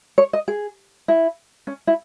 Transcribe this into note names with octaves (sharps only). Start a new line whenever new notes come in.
C#5
D#5
G#4
E4
C#4
E4